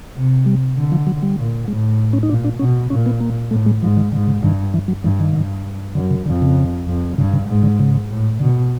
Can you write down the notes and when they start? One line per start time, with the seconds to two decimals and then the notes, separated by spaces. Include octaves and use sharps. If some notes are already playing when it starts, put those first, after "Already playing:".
0.15 C3
0.46 G3
0.77 D3
0.92 F3
1.07 F#3
1.22 G3
1.37 A#2
1.68 A2 G#3
2.13 C#4
2.23 D#4
2.29 A#2 D4
2.44 D4
2.59 B2 C#4
2.90 A#2 C#4
3.06 B3
3.21 A#3
3.51 A2 A3
3.66 G#3
3.82 G#2 F3
3.97 D#3
4.12 G#2 D3
4.27 C#3
4.42 G2 D#3
4.74 E3
4.88 F#3
5.03 G2 E3
5.20 D#3
5.35 G2
5.95 F#2 D3
6.10 C#3
6.26 F2 D3
6.42 C#3
6.87 F2
7.17 G2 C#3
7.33 C#3
7.48 G#2
7.63 D3
7.79 C#3
8.09 A2
8.39 B2 D3